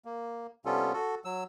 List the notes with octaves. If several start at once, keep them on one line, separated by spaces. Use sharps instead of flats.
A#3
C3 G3 B3 C#4 F4 A4
F#4 A4
F#3 E6